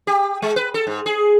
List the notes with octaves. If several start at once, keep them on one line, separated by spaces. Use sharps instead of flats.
G4
G#3
B4
A4
G#2
G#4